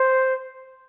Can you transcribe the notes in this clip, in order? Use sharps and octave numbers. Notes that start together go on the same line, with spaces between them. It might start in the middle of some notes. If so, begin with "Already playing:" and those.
Already playing: C5